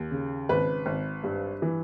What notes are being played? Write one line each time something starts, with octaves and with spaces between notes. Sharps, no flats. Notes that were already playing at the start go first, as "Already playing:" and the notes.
Already playing: D#2
C#3
G#1 B4
G#1
G2
E3